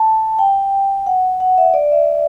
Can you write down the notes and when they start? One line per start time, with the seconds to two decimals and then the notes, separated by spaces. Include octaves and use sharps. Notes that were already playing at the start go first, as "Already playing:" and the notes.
Already playing: A5
0.39 G5
1.06 F#5
1.40 F#5
1.58 E5
1.74 D5
1.92 E5